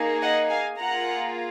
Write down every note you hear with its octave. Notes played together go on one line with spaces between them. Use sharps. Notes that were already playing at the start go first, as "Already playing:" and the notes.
Already playing: A#3 D#4 G#4
D#5 F#5
F5 G#5
A#3 F4 G#4 F#5 A#5